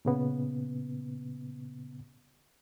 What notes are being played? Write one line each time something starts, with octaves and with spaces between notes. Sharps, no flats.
A#2 C#3 B3